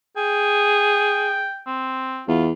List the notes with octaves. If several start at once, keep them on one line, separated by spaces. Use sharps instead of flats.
G#4 G5
C4
E2 F4